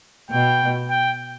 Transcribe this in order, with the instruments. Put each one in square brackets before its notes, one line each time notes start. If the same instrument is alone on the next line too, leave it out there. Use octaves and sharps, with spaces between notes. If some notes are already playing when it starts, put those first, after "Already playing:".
[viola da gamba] B2 [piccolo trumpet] G5
[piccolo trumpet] G5